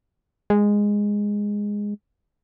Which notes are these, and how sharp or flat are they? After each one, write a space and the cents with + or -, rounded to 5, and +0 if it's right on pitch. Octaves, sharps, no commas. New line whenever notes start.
G#3 -10